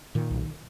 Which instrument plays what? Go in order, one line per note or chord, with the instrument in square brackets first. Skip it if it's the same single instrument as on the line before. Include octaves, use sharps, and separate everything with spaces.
[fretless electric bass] A#2 D#3
B1